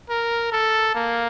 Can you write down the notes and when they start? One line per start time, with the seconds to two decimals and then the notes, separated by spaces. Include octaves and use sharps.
0.09 A#4
0.52 A4
0.95 A#3